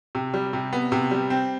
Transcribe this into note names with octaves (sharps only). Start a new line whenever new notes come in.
C3
G3
C3
B3
C3
G3
C4